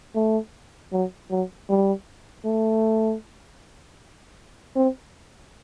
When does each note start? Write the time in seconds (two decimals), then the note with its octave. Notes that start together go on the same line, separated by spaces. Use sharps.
0.15 A3
0.93 F#3
1.31 F#3
1.69 G3
2.45 A3
4.76 C4